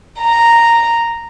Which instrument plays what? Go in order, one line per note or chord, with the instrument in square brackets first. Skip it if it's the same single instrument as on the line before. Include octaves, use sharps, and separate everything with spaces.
[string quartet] A#5